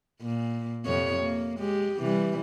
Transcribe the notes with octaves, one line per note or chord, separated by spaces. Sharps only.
A#2
F2 C3 C#5
A#3
G#3 G4
C3 E3 G3